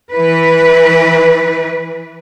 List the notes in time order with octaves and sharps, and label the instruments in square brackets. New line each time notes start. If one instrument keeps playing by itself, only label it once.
[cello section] E3 B4